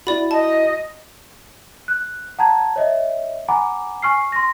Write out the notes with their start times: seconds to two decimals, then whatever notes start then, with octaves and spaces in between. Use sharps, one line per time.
0.07 E4 F#4 D5 B5
0.31 D#5 A5
1.88 F#6
2.39 F#5 A5 A#5 G#6
2.76 C#5 D#5 E5
3.48 F#5 G#5 A#5 B5 D6
4.02 G#5 C#6 F6 C7
4.32 C6 A#6